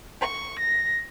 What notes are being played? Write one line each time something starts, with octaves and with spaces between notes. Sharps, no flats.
C#6
A#6